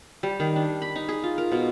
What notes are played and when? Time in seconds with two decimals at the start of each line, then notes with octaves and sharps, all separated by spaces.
0.23 G3
0.40 D#3
0.56 D4
0.82 B5
0.96 D#4
1.09 G#4
1.24 F4
1.38 A#4
1.52 B2